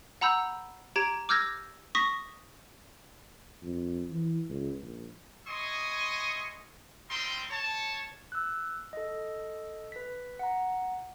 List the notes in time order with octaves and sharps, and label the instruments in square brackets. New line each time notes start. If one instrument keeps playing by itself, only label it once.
[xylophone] F#5 A#5 B5 E6 G6
G4 A#5 G#6 D7
D6 E6 F6 G6 G#6 A#6
C#6 D#6 A#6 B6
[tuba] F2
E3
C#2
A#1
[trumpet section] E4 D#5 G#5 C6 C#6 D#6
G3 C4 D#4 F4 G5 C6
C#5 A5
[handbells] E6 F#6
A4 D#5
B4 B6
F#5 A#5